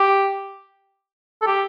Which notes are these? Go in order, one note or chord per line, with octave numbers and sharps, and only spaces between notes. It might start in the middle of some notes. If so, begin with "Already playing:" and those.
Already playing: G4
A4
G4